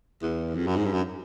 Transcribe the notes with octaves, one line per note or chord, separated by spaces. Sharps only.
E2
F2
F#2
G#2
G2
F#2